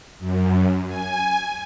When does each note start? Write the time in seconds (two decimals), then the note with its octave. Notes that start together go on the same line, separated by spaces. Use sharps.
0.19 F#2
0.87 G#5